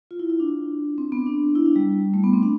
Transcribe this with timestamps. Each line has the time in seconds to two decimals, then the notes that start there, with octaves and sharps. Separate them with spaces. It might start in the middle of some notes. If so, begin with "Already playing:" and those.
0.11 F4
0.19 E4
0.30 E4
0.40 D4
0.98 C4
1.12 B3
1.26 D4
1.55 E4
1.66 D4
1.76 G3
2.14 A3
2.23 B3
2.33 C4
2.43 D4